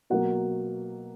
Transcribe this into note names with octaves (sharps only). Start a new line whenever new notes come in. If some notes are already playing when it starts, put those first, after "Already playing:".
B2 F#3 A#3 F#5